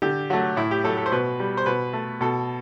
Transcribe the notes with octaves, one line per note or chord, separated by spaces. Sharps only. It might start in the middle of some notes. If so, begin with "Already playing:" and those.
D3 G4
F#3 A3 F#4
A2 E4
G4
F#3 A3 A4
A4
C5
B2 B4
G3
C5
B2 B4
A3
B2 A4